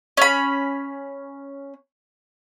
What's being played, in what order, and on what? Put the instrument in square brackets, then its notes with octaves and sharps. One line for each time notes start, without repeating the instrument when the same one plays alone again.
[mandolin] C#4 B5